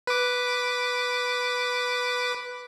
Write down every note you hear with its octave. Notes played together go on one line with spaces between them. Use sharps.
B4 D6